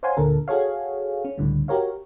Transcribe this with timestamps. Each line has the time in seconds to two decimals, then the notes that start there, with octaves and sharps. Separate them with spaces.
0.03 C5 C#5 F5 F#5 G#5 C6
0.17 D2 A#2 D3 A4 A#4
0.48 F#4 G#4 A4 C#5 F5
1.25 C#4
1.38 C#2 A2 D3 G3
1.68 F#4 G4 A#4 C#5 F5